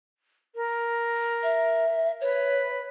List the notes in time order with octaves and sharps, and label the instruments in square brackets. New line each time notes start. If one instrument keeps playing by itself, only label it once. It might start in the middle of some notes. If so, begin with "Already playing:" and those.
[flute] A#4
[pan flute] E5
[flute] B4 [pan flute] C#5